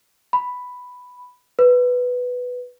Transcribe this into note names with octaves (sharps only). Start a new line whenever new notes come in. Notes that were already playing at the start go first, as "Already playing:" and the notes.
B5
B4